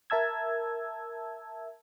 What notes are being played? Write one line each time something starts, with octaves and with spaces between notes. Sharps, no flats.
A#4 E5 A5 E6 G#6